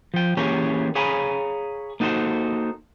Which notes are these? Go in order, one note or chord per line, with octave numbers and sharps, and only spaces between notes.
F3 G5
E3 A#3 C#4 G4 G#4 C#5
G#4 C#5 F5 G#5 A#5 B5
A#3 D#4 F#4 A4 C5